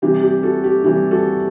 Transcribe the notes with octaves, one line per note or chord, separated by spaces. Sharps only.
C3 E3 G3 G4
G4
F#4 A4
G4
C3 E3 G3 G4
F#4 A4